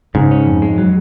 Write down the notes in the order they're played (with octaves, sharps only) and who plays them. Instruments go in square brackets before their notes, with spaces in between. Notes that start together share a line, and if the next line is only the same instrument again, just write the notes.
[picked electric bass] G#2 [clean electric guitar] C#3
[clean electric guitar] C#4
F2
G#3
F#3